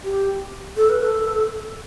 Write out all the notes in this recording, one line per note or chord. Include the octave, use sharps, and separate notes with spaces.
G4
A4
B4
A4